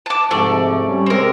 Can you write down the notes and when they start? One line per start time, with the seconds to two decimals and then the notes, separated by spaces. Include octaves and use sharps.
0.06 A5 D6
0.31 G#2 C3 F3 A3 D5 D6
0.87 G3 C#4
1.06 C3 G#3 C4 A#4